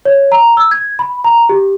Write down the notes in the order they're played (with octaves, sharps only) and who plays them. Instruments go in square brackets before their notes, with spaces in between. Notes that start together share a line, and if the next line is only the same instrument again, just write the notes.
[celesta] C#5
A#5
E6
G#6
B5
A#5
G4